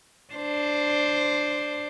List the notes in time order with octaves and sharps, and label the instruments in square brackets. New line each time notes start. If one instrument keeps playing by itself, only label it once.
[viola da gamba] D4 C5